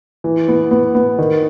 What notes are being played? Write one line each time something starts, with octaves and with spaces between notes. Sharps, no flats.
E3
B3
B3
B3
D#3